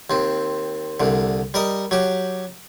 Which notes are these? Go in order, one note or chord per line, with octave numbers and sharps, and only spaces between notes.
D#2 C4
C2 D3
G3 A#4 D#5
F#3 G4